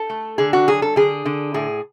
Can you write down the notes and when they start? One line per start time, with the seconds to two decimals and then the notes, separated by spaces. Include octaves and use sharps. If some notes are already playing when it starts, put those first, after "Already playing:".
Already playing: A4
0.10 A3
0.38 D3 G#4
0.53 F#4
0.68 F#3 G#4
0.82 A4
0.96 D3 G#4
1.26 D3
1.54 A2 G#4